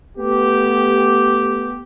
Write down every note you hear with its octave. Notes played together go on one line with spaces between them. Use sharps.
A3 B3 G4